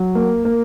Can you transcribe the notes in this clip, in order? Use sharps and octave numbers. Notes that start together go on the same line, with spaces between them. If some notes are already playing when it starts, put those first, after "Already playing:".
Already playing: F#3
A#3
A#3